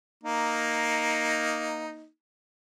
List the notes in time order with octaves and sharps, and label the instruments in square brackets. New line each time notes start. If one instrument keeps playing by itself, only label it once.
[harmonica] A#3 D#4